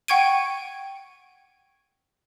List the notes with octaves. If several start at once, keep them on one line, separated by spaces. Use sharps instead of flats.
F#5 G5 C#6 G#6 D7 D#7